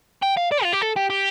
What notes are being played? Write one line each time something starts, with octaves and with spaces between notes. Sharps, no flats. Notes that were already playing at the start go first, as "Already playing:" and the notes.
G5
F5
D5
F4
G4
A4
G4
G4